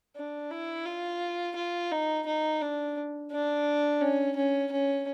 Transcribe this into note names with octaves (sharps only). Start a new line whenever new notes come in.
D4
E4
F4
F4
D#4
D#4
D4
D4
C#4
C#4
C#4